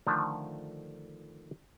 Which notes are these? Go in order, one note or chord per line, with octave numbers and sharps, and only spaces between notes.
D3 D#3 F3 A3 D4